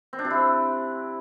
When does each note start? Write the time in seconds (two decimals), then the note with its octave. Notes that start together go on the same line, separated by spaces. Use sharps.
0.13 C4
0.19 D4
0.25 C3
0.31 E4